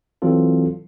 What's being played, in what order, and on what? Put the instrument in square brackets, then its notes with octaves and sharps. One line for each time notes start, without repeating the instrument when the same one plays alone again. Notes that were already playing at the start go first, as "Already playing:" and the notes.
[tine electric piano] E3 F#3 C4 F4 A4